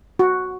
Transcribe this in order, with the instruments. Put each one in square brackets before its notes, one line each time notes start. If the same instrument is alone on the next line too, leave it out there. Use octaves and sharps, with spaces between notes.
[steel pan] F#4